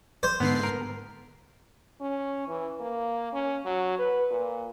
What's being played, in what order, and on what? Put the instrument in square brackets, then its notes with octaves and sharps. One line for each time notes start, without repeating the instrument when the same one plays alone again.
[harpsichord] C5
[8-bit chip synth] G#2 D3 C7 [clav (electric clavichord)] B3
[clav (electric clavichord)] A#4
[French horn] C#4
E3
A#3
C#4
F#3
B4
A#2